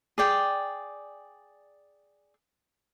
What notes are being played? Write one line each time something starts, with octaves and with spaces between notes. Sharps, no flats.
G#4 D5 G5